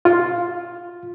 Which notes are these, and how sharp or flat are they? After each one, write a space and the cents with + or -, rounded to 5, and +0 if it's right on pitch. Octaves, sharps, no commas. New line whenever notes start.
F4 +5